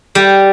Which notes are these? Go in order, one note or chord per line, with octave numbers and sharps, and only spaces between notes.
G3